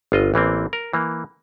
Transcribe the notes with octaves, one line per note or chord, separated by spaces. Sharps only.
G1 F4 D#5
A1 E3 A#3 C4
A#4
E3 A#3